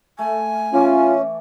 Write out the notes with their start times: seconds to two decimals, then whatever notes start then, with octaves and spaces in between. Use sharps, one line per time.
0.19 A3 G#5
0.73 E3 C#4 F4 C#6 D6